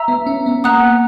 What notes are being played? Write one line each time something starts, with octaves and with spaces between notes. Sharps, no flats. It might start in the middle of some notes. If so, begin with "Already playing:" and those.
Already playing: E5 A#5 E6
B3
C#4
B3
A#3 F#5 A#5 D#6 F#6